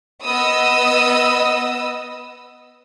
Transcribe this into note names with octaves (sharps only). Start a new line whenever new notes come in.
B3 D#5 D#6 E6